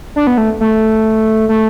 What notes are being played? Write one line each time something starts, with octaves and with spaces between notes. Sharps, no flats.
D4
B3
A3
A3
A3